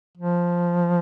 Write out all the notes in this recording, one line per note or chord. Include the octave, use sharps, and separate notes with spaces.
F3